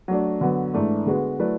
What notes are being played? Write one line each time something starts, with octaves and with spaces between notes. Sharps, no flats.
F#3 A3 D4
D3 F#3 B3
G#2 E3 A3 D4
D3 G#3 B3 F#4 B4
F#3 A3 E4 B4 D5